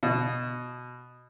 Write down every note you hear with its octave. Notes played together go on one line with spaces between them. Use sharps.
B2